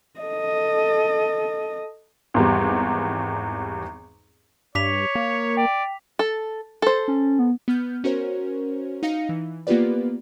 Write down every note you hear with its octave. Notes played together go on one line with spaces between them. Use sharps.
A4 D#5
G#1 E2 G3
G2 C#5 D6 B6 F7
A#3
D5 G5
A4
A4 C5
C#4
B3
B3 F6 G6
C#4 F#4 A#4 C5 C#5
D#4 F5 A#6 C#7
E3
A#3 B3 F4 G4 B4 D5